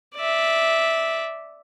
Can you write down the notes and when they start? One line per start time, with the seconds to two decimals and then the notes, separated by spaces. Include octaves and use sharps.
0.16 D5 E5